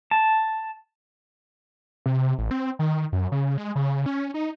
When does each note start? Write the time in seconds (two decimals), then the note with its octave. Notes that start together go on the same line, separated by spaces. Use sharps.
0.11 A5
2.06 C3
2.38 A1
2.51 C4
2.79 D#3
3.12 F#2
3.32 C#3
3.58 G#3
3.75 C#3
4.06 C#4
4.34 D#4